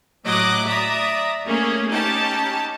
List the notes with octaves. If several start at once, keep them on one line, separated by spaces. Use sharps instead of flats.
A2 F#3 D#5 D6 F#6
D5 E5 A#5 D#6
A3 A#3 C#4 G#4
C#4 D#4 G4 A5